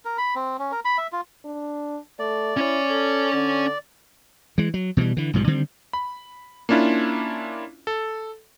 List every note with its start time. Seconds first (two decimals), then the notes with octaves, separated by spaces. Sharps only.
0.05 A#4
0.18 B5
0.35 C4
0.59 C#4
0.72 A#4
0.85 B5
0.98 E5
1.13 F4
1.45 D4
2.19 A3 D5
2.57 C#4 E4 C#5
2.90 A4
3.33 D3
4.58 E3 G#3
4.74 F#3
4.97 B2 E3 F#3 G3
5.17 D3 E3
5.33 B1 G#2 F3 G3
5.47 D3 D#3 G3 C4
5.93 B5
6.69 A#3 C#4 D4 E4 F4
7.87 A4